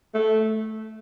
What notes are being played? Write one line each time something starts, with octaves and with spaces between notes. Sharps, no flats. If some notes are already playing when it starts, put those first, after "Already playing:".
A3